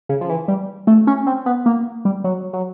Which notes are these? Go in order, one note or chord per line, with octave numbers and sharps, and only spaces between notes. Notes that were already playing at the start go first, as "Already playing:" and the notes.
C#3
F3
E3
G3
A3
C#4
C4
B3
A#3
G3
F#3
F#3